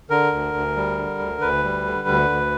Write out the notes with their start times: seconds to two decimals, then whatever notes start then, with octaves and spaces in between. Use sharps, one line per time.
0.10 D3 A#4
0.32 D2
0.54 D2
0.76 G3
0.98 D3
1.19 D2
1.41 D2 B4
1.64 G3
1.86 D3
2.08 D2
2.29 D2